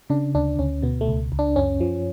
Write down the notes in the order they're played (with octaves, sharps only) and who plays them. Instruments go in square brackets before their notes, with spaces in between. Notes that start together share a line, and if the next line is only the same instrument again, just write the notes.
[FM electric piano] C#3 D4
D2 D4
D2 C#4
B2 B3
A3
C#2
C#2
D4
F#2 C#4
F3